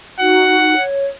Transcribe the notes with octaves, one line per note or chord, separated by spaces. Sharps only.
D#4 F#4 F#5
C#5